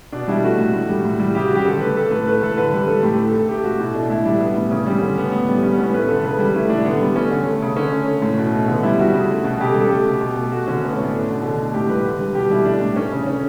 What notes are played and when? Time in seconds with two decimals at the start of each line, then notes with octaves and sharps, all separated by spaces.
0.12 B2 D4
0.28 G3 E4
0.44 A3 F#4
0.59 A2
0.73 A2
0.89 G3
1.05 A2
1.19 G3
1.35 C#3 G4
1.46 F#4
1.51 G3 G4
1.65 D3 A4
1.81 A3 B4
1.96 A3 A4
2.11 A2 B4
2.27 A3 B4
2.42 A2 A4
2.57 D3 B4
2.73 G3
2.88 G3 A4
3.03 A2 G4
3.18 A3
3.28 A4
3.33 A2
3.39 A4
3.49 A3 G4
3.64 A2 F#4
3.79 B2 E4
3.94 A3 D4
4.10 A2 E4
4.25 G3 D4
4.40 G3 B3
4.56 A2
4.71 C#3 C#4
4.87 G3
5.01 D3 C#4
5.17 A3 B3
5.32 A2 B3
5.48 G3
5.63 G3 C#4
5.73 A2 B3
5.83 C#4
5.94 A3 B4
6.08 D3 A4
6.24 C#3 B4
6.39 G3
6.54 A3 E4
6.69 A2 D4
6.85 D3 B3
7.01 G3
7.16 A3 C#4
7.31 D3
7.47 A3
7.62 C#3
7.76 D3 C#4
7.93 A3
8.08 A3
8.22 A2
8.38 B2
8.53 A3
8.68 D3 B3
8.83 G3 E4
8.99 G3 F#4
9.14 C#3
9.30 A3
9.44 B2
9.60 C#3 G4
9.70 A4
9.76 G3
9.81 A4
9.90 A3 G4
10.05 B2
10.21 B2
10.37 A3
10.51 A3 F#4
10.67 D3 C#4
10.82 A3 B3
10.93 C#4
10.98 A2 D4
11.13 A3
11.29 B2
11.43 D3
11.58 A3
11.74 A2 G4
11.90 G3 B4
12.05 D3
12.20 G3
12.35 B2 G4
12.50 G3 E4
12.65 A3 D4
12.82 A2
12.96 A3 C#4
13.12 C#3
13.26 C#3 C#4